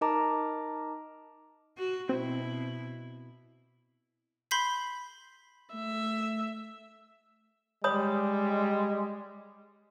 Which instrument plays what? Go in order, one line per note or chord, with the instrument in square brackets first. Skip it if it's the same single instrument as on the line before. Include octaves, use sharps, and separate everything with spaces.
[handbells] D#4 A#4 D#5 A5 A#5 D6
[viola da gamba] F#4
[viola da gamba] B2 E4 [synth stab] C4
[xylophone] B5 C6 G6 B6 C7
[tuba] A3 [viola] E5
[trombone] G3 [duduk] G#3 [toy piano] C#5 B5 D#6